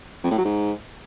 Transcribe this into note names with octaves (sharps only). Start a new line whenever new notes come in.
F2
A2
F#3
G#2